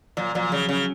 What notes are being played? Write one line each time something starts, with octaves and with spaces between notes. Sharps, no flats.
A#2 F#3
A#2 F#3
C#3 F#3
C#3 C#4